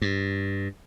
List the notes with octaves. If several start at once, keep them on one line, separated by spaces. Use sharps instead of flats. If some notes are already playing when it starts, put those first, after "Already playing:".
G2